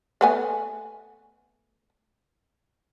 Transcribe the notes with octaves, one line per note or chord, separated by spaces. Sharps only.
A3 B3 G#5